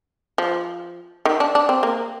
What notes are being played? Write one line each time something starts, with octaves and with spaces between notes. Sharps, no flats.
F3
D#3
D4
D4
C4
A#3